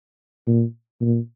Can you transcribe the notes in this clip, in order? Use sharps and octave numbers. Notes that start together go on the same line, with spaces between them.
A#2
A#2